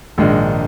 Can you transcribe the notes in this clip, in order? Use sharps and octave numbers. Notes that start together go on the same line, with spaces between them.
A#1 G#2 D#3 G#3 D4